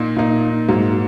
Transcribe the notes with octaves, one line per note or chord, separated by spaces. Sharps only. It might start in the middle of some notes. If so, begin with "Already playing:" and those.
Already playing: A#2 A#3 D#4
A#2 A#3 D#4
G#2 F#3 A#3